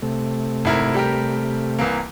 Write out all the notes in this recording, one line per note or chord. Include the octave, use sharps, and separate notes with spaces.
C3 A3
G#1 E4 A#4
G3 G4 A#4
C2 E3 A#3